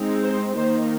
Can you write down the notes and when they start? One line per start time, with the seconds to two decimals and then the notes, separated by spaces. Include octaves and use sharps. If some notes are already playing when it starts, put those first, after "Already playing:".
Already playing: G#3 C4 D#4
0.23 C5
0.56 D#3 A#3 D#4 C5